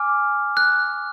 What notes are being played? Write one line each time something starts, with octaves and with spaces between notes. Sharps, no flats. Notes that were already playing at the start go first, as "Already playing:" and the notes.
Already playing: G#5 D6 F6
F#6